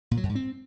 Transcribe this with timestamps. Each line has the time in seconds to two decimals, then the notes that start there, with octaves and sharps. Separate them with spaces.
0.11 A#2
0.17 F#3
0.23 F#2
0.29 G#2
0.35 C4